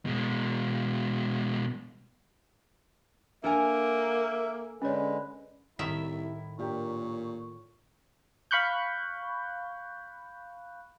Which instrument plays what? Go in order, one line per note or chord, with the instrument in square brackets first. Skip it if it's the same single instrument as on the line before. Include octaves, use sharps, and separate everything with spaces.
[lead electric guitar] B2 G#3
[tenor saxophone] A#3 [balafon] D4 [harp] A4 A#4 G#5 [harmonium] E5
[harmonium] D3 G#3 B4 [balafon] C#4 C#5
[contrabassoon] C2 [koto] A2 D#3 E5 [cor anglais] E4 [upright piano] B6
[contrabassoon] A#2 [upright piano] D4 G4 A#4 [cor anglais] C#5
[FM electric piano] F5 B5 C#6 F#6 G6